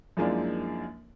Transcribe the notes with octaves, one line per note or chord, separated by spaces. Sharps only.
F#2 F3 G#3 A#3 D4 E4